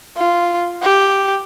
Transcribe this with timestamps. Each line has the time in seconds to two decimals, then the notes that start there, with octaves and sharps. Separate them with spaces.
0.17 F4
0.83 G4